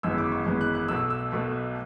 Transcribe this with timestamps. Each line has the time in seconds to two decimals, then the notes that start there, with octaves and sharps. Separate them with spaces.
0.03 G#1 F#2 E3 G#3 B3 E6
0.18 D6
0.32 C#6
0.46 G#1 F#2 E3 G#3 B3
0.61 F#6
0.75 F#6
0.88 B1 B2 A3 E6
1.10 E6
1.32 B1 B2 A3